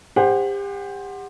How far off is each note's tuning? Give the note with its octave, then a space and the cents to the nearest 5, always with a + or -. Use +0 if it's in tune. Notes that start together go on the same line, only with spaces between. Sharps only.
G4 +35 C5 +5 F#5 +0